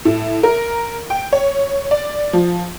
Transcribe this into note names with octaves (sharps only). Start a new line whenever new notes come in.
A2
A#4
G5
C#5
D5
F3